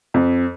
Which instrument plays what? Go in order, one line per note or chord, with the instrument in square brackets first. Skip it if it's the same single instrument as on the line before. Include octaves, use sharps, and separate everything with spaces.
[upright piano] F2